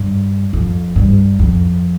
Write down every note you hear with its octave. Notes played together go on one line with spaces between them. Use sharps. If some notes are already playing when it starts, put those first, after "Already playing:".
Already playing: G2
F2
G2
F2